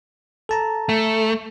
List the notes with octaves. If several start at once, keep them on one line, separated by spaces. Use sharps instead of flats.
A4 A5 A#5
A3